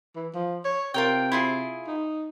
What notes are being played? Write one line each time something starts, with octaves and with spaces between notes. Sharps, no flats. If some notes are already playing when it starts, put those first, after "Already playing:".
E3
F3
C#5
C3 F4 A#4 G5
E4 F4 G#4
D#4